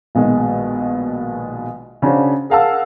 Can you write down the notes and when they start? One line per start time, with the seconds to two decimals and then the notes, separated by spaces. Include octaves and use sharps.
0.15 A#1 B2 D#3 G#3
2.02 C#3 C#4 D4 F#4 C5
2.50 G#4 A#4 F5 F#5 A5 E6